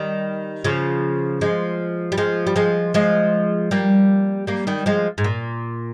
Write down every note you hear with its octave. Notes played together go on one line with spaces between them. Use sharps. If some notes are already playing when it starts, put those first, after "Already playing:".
Already playing: D#3 G3
C#3 F3
F3 G#3
G3
F3 G#3
G3
F3 G#3
F3 G#3
G3 A#3
G3 A#3
D#3 G3
F3 G#3
G#2
A#2